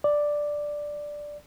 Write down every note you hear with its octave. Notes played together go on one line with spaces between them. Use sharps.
D5